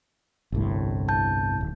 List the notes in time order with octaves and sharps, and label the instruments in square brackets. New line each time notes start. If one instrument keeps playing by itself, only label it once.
[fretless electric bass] G1 C2 A2
[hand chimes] A5 G6
[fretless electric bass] D1